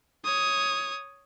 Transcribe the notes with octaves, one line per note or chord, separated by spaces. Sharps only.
C#5 D#6